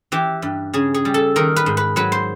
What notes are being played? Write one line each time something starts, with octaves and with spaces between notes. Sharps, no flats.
E3 G4
G2
C#3 G#4
G#4
G3
A4
D#3 A#4
B4
G#2
B4
F#3 B4
C5